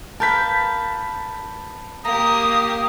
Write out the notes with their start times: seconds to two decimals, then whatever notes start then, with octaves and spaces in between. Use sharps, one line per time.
0.20 A#4 B4 F5 A5 G6 B6
2.05 A#3 G4 A#5 D#6